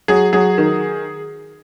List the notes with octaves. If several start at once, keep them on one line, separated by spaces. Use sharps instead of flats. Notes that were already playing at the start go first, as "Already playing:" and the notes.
F#3 G#4
F#3 G#4
D#3